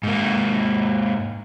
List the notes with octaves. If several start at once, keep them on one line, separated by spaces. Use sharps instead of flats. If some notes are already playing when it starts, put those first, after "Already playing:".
G#2 A#3